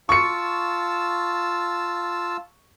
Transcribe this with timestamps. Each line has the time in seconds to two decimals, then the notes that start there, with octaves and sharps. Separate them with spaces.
0.09 F4 A5 C#6 E6 C#7